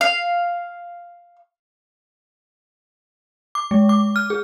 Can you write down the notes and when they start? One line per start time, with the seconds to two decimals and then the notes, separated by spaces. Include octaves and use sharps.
0.01 F5
3.55 D6
3.71 G#3
3.89 D6
4.16 F6
4.30 G#4